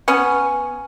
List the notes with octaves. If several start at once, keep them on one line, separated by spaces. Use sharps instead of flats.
B3 C#4